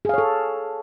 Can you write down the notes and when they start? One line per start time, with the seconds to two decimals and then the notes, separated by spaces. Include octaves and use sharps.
0.05 G#4
0.09 F5
0.14 C#5
0.18 A4